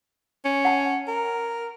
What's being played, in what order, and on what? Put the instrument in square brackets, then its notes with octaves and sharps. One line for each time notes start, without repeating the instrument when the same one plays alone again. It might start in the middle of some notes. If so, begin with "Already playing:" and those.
[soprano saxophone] C#4
[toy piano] F#5 A5
[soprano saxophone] A#4